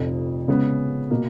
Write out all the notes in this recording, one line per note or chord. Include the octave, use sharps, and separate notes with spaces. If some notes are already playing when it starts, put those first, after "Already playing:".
Already playing: F1 F2 F3
C#3 G#3 B3
B2 A#3